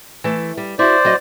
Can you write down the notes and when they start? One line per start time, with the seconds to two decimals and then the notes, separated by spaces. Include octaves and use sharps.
0.24 E3 A3
0.57 G3
0.79 E4 F#4 C5 D5
1.05 F#3 F#4 D#5